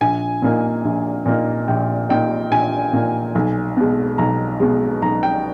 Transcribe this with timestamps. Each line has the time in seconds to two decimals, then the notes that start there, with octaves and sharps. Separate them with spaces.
0.01 A#1 G#5
0.42 A#2 A#3 D#4
0.85 A#1
1.26 A#2 A#3 D#4
1.68 A#1 G5
2.09 A#2 A#3 D#4 G5
2.51 A#1 G#5
2.93 A#2 A#3 D#4
3.35 B1
3.77 B2 G#3
4.18 B1 A#5
4.60 B2 G#3
5.02 B1 A#5
5.23 G5